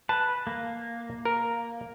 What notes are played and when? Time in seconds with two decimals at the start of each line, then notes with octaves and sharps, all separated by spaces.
0.09 B4 A5
0.47 A#3
1.25 A#4